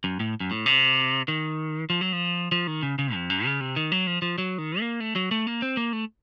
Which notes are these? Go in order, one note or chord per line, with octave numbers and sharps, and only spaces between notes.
F#2
A2
F#2
A2
C3
D#3
F3
F#3
F3
F3
D#3
C#3
C#3
F2
F#2
C#3
C3
D#3
F#3
F3
F3
F#3
D#3
A#3
A3
F#3
A3
A#3
C4
A#3
A3